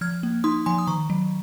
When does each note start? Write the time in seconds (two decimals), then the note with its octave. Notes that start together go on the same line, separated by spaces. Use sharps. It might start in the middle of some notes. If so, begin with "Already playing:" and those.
0.01 F3 F6 G#6
0.23 A#3
0.44 D#4 C6 D#6
0.66 F3 G#5 C6
0.78 D#6
0.87 D#3 A#5 C#6
1.10 F#3